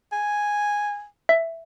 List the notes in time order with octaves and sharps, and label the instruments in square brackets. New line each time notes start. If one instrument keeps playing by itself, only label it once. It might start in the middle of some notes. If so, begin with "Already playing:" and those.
[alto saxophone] G#5
[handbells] E5